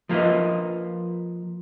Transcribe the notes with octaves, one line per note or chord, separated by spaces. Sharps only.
F3 A#3 F4 B4 D#5